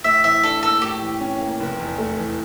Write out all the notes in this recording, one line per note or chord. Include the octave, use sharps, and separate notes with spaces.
A2 E5
E3 E5
D4 A4
A#3 A4
A2 G4
E3
C#4
A#3
F1
E2
A3
E3